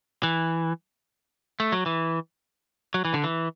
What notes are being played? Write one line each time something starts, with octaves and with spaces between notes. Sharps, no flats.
E3
A3
F#3
E3
F#3
E3
D3
E3